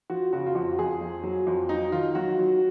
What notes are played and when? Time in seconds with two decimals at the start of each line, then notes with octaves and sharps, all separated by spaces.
0.10 F3 F#4
0.33 C#3 F#4
0.46 F4
0.55 F2 F#4
0.78 F2 G#4
1.01 F2
1.23 F#3
1.47 F2
1.69 F#3 D#4
1.92 D#3 F4
2.15 F#3 F#4
2.39 F#3